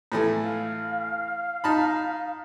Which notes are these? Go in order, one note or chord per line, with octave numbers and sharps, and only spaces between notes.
A2 E3 A3
F5
D#4 A5 B5